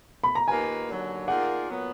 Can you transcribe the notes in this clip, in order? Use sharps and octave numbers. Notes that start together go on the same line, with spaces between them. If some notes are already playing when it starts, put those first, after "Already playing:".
B5
A#5
D#2 D#3 A#3 F4 B4 G#5
D#2 D3 F#3
D#3 A#3 F4 G#4 D5 F#5
A#2 F#3 B3